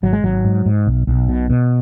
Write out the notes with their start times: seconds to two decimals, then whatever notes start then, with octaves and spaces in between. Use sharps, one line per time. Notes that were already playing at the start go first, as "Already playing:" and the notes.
0.03 G#1 F#3
0.13 G#3
0.23 G#1 F#3
0.45 G#2
0.66 G#2
0.87 B1
1.07 B1
1.29 B2
1.50 B2